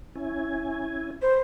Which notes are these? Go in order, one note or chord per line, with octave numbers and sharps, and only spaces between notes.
C#4 E4 G#5
B4 C5